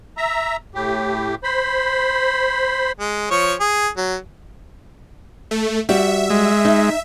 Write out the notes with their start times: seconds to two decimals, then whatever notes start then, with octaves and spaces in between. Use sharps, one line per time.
0.17 E5 A#5
0.75 A2 G4
1.43 C5 B5
3.00 G#3
3.31 F3 C#5 C#6
3.60 G#4
3.97 F#3
5.51 A3
5.89 G3 F#4 E5
6.30 G#3
6.65 D#4